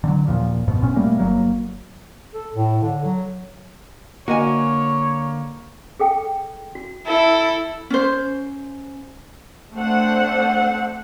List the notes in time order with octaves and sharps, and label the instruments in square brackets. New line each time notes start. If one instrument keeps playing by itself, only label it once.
[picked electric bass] D3 F#3
D#2 A#2 F3
F2 G#2 B2
D#1 B1 B2 C#4
G3 A3 A#3
G1 F#3 A#3
[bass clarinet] A4
A2
D3
F#3
[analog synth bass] D3 [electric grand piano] A#3 [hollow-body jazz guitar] F#4 D#5 G#5 [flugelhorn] C#5
[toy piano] G#4 A4 G5
F#4
[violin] E4 A4
[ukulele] C#4 C5
[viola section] A3 C4 D4 A4 C5 F#5